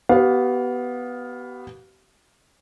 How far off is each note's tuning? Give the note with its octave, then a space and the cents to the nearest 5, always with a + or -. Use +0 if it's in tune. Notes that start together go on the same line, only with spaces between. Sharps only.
B3 +0 G4 -35 F5 +15